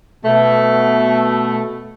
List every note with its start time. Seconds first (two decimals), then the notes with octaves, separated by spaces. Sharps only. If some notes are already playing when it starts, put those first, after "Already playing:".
0.24 B2 A3